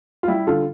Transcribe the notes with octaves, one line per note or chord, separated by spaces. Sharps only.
F4
G3 E4 G4
D3 F4 A4